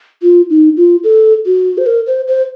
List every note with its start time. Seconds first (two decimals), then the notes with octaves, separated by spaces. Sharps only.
0.22 F4
0.50 D#4
0.77 F4
1.04 A4
1.46 F#4
1.78 C5
1.86 A#4
2.07 C5
2.28 C5